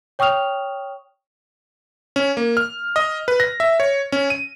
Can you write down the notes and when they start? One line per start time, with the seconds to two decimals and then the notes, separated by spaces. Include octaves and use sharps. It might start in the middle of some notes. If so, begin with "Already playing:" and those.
0.19 C#5 G5 C#6 D#6 F6 F7
2.16 C#4
2.37 A#3
2.57 F6
2.96 D#5
3.28 B4
3.40 A#6
3.60 E5
3.80 C#5
4.12 C#4
4.30 D#7